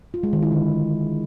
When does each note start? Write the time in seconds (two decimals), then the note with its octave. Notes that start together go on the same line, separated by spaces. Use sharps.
0.14 F4
0.23 G#3
0.33 D#3
0.42 E4
0.52 D3